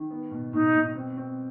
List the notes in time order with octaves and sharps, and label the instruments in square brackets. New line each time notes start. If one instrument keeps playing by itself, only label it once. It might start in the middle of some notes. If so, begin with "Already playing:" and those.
Already playing: [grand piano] D#3
B3
B2
[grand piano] B2 [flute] D#4
[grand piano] B2
C4
C4